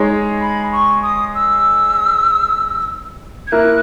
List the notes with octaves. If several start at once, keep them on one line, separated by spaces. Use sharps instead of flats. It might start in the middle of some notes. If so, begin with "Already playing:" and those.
Already playing: G#3 D#4 G#4 C#5
B5
C#6
D#6
E6
G#6
A#3 E4 A#4 F#6